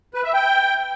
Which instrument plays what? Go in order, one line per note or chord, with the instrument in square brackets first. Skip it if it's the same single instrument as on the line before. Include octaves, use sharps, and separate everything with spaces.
[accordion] B4
E5
G5